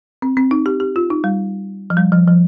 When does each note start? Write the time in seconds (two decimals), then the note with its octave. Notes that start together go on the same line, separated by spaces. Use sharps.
0.22 C4
0.37 C4
0.51 D#4
0.66 G4
0.80 G4
0.96 F4
1.10 D#4
1.24 G3
1.90 F3
1.97 G3
2.12 F3
2.27 F3